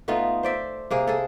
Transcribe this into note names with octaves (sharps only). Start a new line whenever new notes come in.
A3 B3 D#4 F4
C5 D5 E5
C3 A#3 G#4
G#4 A4